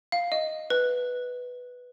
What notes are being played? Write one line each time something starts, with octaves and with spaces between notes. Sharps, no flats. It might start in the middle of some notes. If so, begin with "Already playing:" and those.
F5
D#5
B4